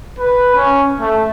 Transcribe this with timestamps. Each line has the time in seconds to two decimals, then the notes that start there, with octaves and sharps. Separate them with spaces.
0.19 B4
0.56 C#4
1.00 A3